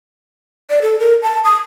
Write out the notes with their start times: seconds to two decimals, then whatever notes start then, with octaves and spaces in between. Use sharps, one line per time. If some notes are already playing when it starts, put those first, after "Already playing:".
0.70 D5
0.82 A4
0.99 A#4
1.23 A5
1.44 D#6